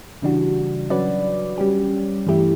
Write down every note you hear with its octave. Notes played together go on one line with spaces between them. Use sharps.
C#3 E3 G3 D4 F#4
F#3 C#4 F#4 B4 D5
G3 C#4 G4
G2 E3 A3 E4 G4